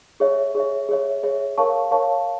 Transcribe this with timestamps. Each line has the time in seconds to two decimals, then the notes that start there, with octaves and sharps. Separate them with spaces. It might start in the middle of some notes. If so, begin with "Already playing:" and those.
0.20 G#4 C#5 E5
0.55 G#4 C#5 E5
0.89 G#4 C#5 E5
1.23 G#4 C#5 E5
1.58 A#4 C#5 F5 A5 C#6
1.91 A#4 C#5 F5 A5 C#6